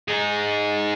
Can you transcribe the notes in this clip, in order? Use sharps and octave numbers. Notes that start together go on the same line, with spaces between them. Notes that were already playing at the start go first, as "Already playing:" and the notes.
D#4 G#4